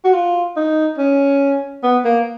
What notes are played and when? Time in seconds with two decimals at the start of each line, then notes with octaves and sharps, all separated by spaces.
0.04 F#4
0.13 F4
0.56 D#4
0.98 C#4
1.83 B3
2.04 A#3